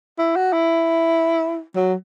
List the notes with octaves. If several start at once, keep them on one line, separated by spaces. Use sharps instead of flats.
E4
F#4
E4
F#3